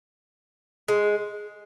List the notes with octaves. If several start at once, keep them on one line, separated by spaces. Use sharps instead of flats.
G#3